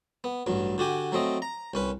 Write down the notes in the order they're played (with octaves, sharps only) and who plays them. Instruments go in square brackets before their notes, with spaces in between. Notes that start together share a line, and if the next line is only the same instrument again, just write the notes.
[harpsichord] B3
A1 G2 F#3
D3 F#4 G4 G#5
F#3 A3 C4 D#5
A#5
C2 C#4 B4